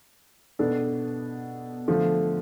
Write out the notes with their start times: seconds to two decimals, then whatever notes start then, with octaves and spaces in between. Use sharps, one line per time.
0.59 B2 B3 D4 A4
1.88 D3 F3 A3